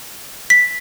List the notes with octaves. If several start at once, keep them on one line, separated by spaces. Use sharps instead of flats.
B6